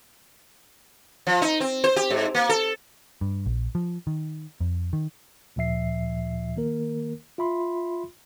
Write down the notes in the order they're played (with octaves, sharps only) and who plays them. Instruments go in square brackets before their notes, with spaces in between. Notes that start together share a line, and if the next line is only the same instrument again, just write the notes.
[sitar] F3
D#4
C4
C5
G4
G#2
A#3
A4
[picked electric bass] G2
A#1
F3
D#3
F2
D#3
[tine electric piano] D2 A#2 F3 E5 C7
D#3 A#3 A#4
F4 E5 B5 C6